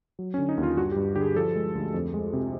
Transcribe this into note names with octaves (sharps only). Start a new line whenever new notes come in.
F#3
C#4
D3
D#4
D#2
F4
G2 F#4
G4
G2
D3 G4
G#4
F3 A4
G#3
D2
F2
G#3
C3